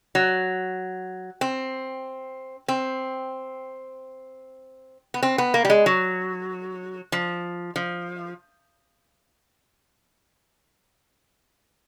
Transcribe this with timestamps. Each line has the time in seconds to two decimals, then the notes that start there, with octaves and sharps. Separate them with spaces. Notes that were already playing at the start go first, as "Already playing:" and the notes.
0.15 F#3
1.41 C4
2.68 C4
5.14 B3
5.23 C4
5.38 B3
5.54 A#3
5.65 G3
5.70 G#3
5.86 F#3
7.12 F3
7.76 F3